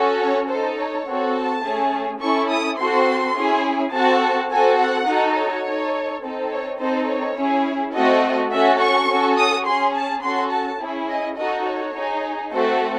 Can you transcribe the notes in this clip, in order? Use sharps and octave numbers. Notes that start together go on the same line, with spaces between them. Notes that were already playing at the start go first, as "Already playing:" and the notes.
Already playing: C#4 F#4 A4
C#5
D#4 A4 C5
C#5
C4 F#4 A4
A5
A3 C#4 G#4
C#4 E4 A4 C#6
D#6
C4 F#4 A4 C6
C#4 E4 G#4
C4 F#4 A4 A5
C4 F#4 A4 G#5
F#5
D#4 F#4 A4
C#5
D#4 A4
C4 D#4 A4
C#5
C4 D#4 A4 C5
C#5
C#4 E4 G#4
A3 C4 F#4 A4 D#5
C#4 F#4 A4 E5
C#6
C#4 F#4 A4
D#6
C#4 G#4 C6
A5
C#4 F#4 A4 C6
A5
C#4 E4 G#4
D#5
D#4 F#4 A4 D#5
C#5
D#4 G#4
A3 C4 F#4 A4 C5